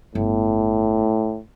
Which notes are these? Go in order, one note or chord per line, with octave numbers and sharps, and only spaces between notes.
G1 A2